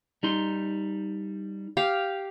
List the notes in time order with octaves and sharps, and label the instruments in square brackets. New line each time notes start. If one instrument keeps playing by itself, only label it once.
[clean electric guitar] G3 D#4 C6
[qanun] G4 F5